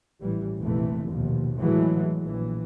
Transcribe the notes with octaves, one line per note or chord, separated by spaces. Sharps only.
A1 E3 G3
F1 A#1 F2 E3 A3
A#1 D#2 B2 F3
A2 E3 F#3 G#3 A3
A#1 E3